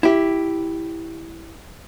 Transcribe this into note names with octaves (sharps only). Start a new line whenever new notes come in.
E4 G4